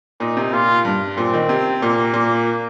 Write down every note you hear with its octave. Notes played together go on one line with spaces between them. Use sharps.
A#2 D#4
C3
A#2 F4
G2
A#2 C4
D#3
C3
A#2 A#3
A#2